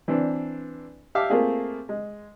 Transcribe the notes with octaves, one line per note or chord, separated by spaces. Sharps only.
E3 C4 D4
G4 E5 F5 A5 D6
A3 A#3 C4 F4 G#4
G#3